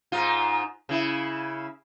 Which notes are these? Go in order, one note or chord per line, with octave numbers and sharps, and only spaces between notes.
G#2 D#4 F4
C#3 E4